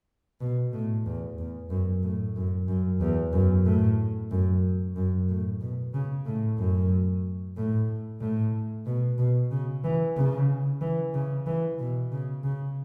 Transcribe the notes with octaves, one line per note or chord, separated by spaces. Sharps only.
B2
A2
E2
E2
F#2
A2
F#2
F#2
E2
F#2
A2
F#2
F#2
A2
B2
C#3
A2
F#2
A2
A2
B2
B2
C#3
E3
C#3
E3
C#3
E3
B2
C#3
C#3